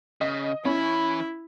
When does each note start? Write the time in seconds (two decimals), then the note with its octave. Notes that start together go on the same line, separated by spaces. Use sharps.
0.21 C#3 D#5
0.65 E3 C#4 E4 B5